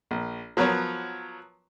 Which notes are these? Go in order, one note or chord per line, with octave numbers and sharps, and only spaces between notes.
A#1
F3 F#3 B3 A#4 C#5